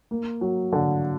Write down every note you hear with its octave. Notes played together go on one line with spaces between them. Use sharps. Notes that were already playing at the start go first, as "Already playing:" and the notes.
A#3
F#3
D3